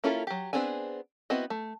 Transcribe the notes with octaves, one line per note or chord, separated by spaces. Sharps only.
A#3 C#4 E4 F4 A4
F#3 G4
B3 C4 D4 G#4 G#5
B3 C4 E4 F#4 D#5
A3